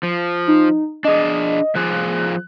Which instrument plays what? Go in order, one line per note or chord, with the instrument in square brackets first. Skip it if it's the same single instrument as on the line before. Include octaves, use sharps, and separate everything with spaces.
[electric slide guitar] F3
[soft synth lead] D#4
[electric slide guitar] D4 G#4 [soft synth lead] D#5
[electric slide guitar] F3 F4 G#4 [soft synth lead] F#6